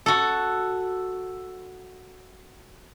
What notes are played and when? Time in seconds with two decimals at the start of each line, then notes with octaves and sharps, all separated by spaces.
0.06 F#4 A4